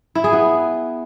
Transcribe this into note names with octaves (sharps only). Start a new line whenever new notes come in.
E4
G#4
B3